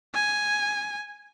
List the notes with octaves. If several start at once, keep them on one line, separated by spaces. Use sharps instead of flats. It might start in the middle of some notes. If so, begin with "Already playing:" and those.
G#5